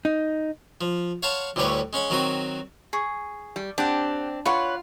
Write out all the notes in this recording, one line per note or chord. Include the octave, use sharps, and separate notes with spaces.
D#4
F3
C#5 F5 F#5 A5 B5 C6
D2 A2 D3 G3 B4 C#5
G#3 C#4 F#5 B5
D#3 F#3 C4 F#4 D#6
G#4 C#6
G3
C4 D4 G4 F#5
F4 B4 C#5 F#5